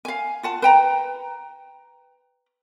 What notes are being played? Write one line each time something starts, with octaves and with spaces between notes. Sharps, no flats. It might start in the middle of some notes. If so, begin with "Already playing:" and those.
F5 G#5
F4 F#5 A5
B4 G5 A#5